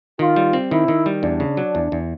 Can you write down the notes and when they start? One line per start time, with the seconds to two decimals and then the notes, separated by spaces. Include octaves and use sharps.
0.19 D#3 F4
0.36 G3
0.53 C4
0.71 D#3 E4
0.88 D#3
1.06 G3
1.23 E2 D4
1.40 C#3
1.57 F#3
1.75 E2
1.92 E2